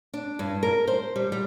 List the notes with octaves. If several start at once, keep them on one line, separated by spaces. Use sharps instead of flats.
D4
G2
A#4
C5
G3
G3